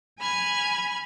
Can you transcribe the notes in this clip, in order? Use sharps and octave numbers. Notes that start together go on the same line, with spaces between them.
G#5 B5 F6 G#6